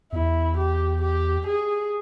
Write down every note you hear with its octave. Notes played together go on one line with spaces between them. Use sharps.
E2 E4
G4
G4
G#4